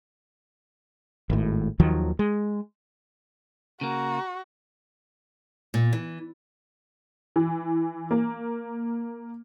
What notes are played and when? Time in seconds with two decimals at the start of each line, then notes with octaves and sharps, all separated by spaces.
1.30 G#1 A2
1.80 D#2 D#3 F3 F#3
2.19 G#3
3.81 C#3 A#3 F#4 A#5
5.74 A#2
5.93 E3
7.36 E3
8.11 A#3